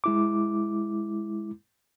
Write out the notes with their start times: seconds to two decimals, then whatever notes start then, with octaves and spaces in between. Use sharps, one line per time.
0.04 G#3 E4 D6